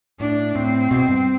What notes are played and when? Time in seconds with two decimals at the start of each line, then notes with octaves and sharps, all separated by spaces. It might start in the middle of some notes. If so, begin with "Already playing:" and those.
0.20 A2 D4
0.56 A2 C4
0.91 B2
1.08 G2